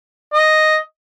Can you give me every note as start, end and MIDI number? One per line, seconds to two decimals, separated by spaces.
0.34 0.77 75